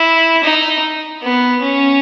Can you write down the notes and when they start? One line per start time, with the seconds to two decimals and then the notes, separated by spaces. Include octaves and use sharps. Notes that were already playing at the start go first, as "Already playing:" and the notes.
Already playing: E4
0.44 D#4
1.22 B3
1.62 C#4